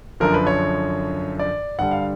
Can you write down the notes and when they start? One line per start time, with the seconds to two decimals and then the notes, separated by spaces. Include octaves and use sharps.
0.20 F#2 D3 F3 A#4
0.34 B4
0.47 C#5
1.39 D5
1.78 G2 D3 G3 F#5
1.91 F5